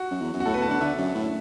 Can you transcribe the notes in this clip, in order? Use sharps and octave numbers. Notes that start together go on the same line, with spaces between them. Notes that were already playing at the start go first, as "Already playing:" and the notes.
Already playing: F#4
F#2
E2
F#2
F#4
A2 A4
B4
B2
A5
D3 F#5
D3 E5
F#2
A2